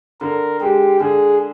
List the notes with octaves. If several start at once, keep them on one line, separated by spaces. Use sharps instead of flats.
D3 A#4
G#3 G4
D3 G#4